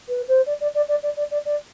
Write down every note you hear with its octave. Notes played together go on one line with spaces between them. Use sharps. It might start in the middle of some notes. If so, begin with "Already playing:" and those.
B4
C5
D5
D5
D5
D5
D5
D5
D5
D5